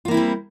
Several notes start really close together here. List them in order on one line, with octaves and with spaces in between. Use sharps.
F4 A#3 E4 C4 G3